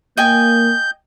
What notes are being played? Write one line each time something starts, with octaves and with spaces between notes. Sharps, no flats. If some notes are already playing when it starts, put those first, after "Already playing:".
A#3 D#5 G5 G#5 G6